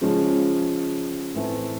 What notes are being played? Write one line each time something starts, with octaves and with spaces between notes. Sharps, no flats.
C#3 F3 G#3 C#4
A2 E3 A3 C4